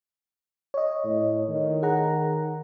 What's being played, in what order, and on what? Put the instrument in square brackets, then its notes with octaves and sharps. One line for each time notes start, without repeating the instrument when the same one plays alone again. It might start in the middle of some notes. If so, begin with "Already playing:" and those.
[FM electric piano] C#5 D#5
[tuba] A2
D#3
[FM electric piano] G#4 F#5 A#5